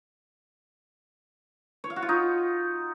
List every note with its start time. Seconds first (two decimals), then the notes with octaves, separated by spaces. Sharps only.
1.84 C#5
1.90 F5
1.96 F#4
2.02 F4
2.09 D#4